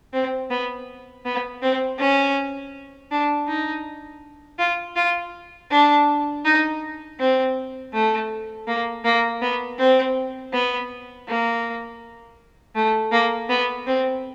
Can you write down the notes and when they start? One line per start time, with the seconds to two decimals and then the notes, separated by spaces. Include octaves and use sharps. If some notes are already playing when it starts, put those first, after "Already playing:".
0.13 C4
0.51 B3
1.25 B3
1.62 C4
1.99 C#4
3.11 D4
3.47 D#4
4.59 F4
4.96 F4
5.71 D4
6.45 D#4
7.19 C4
7.93 A3
8.67 A#3
9.05 A#3
9.42 B3
9.79 C4
10.53 B3
11.28 A#3
12.76 A3
13.12 A#3
13.49 B3
13.87 C4